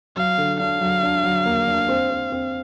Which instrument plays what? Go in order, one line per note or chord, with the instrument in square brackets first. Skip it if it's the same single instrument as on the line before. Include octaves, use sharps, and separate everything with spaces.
[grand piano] F#3 [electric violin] F5
[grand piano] D3
[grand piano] D4 [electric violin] F5
[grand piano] F#3
D4
F#3
A#3
D4
C4
C4
C4